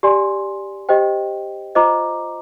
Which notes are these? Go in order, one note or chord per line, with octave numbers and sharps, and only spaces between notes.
G4 D5 G#5 C6
G4 C5 D#5 G5
F4 C5 D#5 A#5 D6